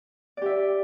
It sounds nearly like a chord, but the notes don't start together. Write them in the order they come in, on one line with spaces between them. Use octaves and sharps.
D5 G4 E5